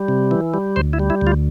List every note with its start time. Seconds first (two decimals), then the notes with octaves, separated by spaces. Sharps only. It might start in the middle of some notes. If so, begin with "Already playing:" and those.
Already playing: G3
0.08 C3
0.31 E3
0.54 G3
0.76 D2 C5
0.93 E4
0.99 G3
1.10 E4
1.21 D2
1.27 F4